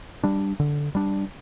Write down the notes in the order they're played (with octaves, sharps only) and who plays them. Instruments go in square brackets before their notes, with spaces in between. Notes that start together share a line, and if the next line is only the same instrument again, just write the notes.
[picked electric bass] G3 D4
D3
G3 D4